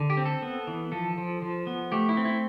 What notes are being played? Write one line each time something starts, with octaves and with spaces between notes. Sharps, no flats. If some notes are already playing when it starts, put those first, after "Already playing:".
Already playing: D3
G4
C4
A4
B3
E3
F3 A4
F3
F3
B3
A3 G4
E4
C4
E4